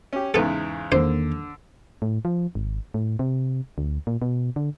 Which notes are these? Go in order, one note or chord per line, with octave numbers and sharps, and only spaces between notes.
C#4 G4
E2 G#2 C#3 B3 A4
E2 D3 D#3 A#3 C5
A2
F3
G#1
A2
C3
D2
A#2
B2
D3